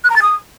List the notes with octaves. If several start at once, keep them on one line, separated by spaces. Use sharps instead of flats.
F#6
A#5
A6
D#6